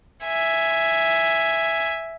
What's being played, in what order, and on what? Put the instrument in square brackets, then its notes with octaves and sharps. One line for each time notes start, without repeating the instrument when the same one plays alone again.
[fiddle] E5 G#5